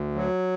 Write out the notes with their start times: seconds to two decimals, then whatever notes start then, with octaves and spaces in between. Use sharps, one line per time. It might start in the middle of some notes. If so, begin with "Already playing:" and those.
Already playing: D2
0.15 F#3